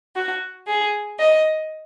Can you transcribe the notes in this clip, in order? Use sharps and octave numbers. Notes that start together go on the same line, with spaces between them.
F#4
G#4
D#5